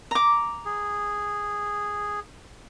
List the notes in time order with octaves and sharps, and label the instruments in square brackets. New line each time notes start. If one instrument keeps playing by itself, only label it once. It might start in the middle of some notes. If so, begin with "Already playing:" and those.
[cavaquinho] A#5 D6
[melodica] G#4